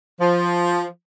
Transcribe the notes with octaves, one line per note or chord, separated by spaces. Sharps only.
F3